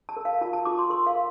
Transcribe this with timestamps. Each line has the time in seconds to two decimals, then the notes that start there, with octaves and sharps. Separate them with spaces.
0.09 A5
0.17 A#4
0.25 F5
0.41 F4 A5
0.53 A5
0.65 F4 D6
0.79 C6
0.90 A#4 C6
1.07 F5
1.15 A#4